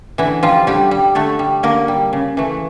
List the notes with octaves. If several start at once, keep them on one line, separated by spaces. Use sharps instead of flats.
D3 E3 E4
F3 G3 F4
D3 G3 G4
G3
D3 A3 A4
G3
D3 A#3 A#4
G3
C#3
E3 A3